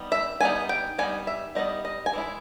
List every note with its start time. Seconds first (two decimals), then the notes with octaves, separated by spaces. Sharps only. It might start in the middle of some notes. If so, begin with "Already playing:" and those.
Already playing: G3 B3 D#4
0.12 E5
0.41 G3 B3 D#4 G#5
0.69 G5
0.98 G3 B3 D#4 G#5
1.27 E5
1.55 G3 B3 D#4 D#5
1.85 D#5
2.06 G#5
2.13 E3 G#3 E4